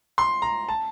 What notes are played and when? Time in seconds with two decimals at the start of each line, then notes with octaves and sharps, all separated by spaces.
0.18 C6
0.42 A#5
0.69 A5